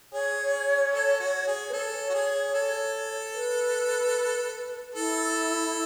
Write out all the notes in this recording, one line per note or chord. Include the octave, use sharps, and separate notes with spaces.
G#4 C#5
A4
F#4
G#4
B4
A4 C#5
F#4
G#4
A4
B4
E4 A4